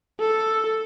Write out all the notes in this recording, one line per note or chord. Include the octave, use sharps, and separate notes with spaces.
A4